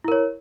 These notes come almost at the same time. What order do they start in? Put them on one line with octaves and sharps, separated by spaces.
E4 A#4 C#5